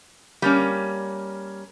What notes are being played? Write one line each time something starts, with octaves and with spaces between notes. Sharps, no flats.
G3 A#3 C#4